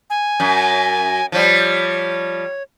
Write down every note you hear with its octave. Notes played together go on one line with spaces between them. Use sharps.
G#5
F#2
F3 G3 C#5